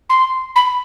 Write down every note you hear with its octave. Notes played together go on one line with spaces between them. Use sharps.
C6
B5